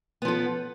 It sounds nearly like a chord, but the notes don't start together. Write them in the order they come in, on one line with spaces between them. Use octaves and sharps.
B3 F3 A4